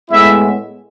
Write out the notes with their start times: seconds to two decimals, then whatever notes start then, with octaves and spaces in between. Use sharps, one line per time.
0.10 A2 G#3 B3 E4 E5